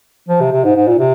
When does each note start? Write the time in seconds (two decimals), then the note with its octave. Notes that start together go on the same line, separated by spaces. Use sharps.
0.29 F3
0.41 C3
0.52 C3
0.64 G#2
0.76 G#2
0.88 A#2
0.99 C3